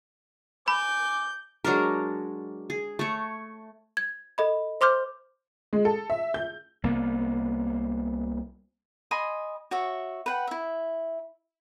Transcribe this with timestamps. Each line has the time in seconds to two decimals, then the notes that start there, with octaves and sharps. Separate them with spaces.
0.68 G#5 B5 D6 G6
1.64 F#3 G#3 D4 A#4
2.70 G#4
2.99 A3 C#5
3.97 G#6
4.38 A4 D#5 B5
4.81 C5 C6 D6 F6 G6
5.73 G#3
5.85 A4
6.10 E5
6.34 G6
6.84 C2 A#3 B3
9.11 D#5 G#5 B5 C6
9.71 F#4 C#5 E5
10.26 B4 F#5 G5
10.47 E4 E5